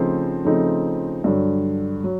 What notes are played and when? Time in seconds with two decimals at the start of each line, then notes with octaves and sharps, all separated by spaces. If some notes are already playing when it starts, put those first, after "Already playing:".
Already playing: C#3 F3 A3 C4 D#4
0.45 C#3 F3 A3 C4 D#4
1.24 G2 D3 F#3
2.04 F#3